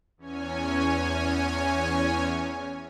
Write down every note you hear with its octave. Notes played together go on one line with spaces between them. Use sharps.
E2 C#4 C#5 G#5